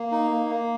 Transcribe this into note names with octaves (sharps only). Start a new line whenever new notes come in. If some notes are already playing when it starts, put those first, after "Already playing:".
Already playing: A#3
D#4
A#3
A#3